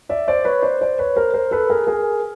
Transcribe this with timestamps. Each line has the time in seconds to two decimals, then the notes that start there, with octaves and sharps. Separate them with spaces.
0.09 D5 E5
0.28 C5 D5
0.45 B4 C#5
0.62 C5 D5
0.81 C5 D5
0.99 B4 C#5
1.16 A#4 C5
1.34 A#4 C5
1.51 A4 B4
1.70 G#4 A#4
1.87 G#4 A#4